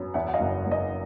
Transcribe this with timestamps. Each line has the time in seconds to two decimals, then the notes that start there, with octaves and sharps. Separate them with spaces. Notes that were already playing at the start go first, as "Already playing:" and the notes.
Already playing: F#2 B3
0.14 E2 E5 F#5
0.28 F#5
0.34 D#5 F5
0.40 F#1
0.66 F#1
0.71 D#5